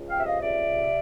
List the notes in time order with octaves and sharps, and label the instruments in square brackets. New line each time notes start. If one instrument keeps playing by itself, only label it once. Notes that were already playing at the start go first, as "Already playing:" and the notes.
Already playing: [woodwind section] C#2
F5 G5
C3 E5
D#5 F5
C#2 D5 E5
C3